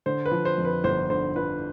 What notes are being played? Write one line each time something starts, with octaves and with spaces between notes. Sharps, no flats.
D3 C5
B4
F3
C5
F2
B4
G1 C5
D3 C5
F3 B4